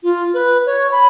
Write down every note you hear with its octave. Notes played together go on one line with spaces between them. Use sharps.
F4
B4
C#5
B5